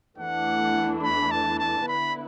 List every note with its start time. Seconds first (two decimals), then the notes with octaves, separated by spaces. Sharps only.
0.18 E2 E3 A3 D4 F#5
1.03 B5
1.31 A5
1.59 A5
1.87 D3 B3 E4 B4 B5